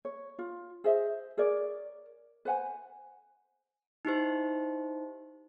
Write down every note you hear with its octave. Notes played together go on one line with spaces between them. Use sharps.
C#5
F4
G#4 C5 D#5 E5
G#4 A#4 C#5 D5
B4 C5 F#5 G#5
D#4 E4 G4 C5